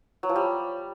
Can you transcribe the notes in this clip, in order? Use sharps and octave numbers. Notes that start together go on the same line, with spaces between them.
F#3
F3
G3